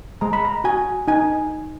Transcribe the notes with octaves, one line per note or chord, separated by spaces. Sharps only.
G#3 A#5
B5
A#5
F#4 G#5
D#4 G#5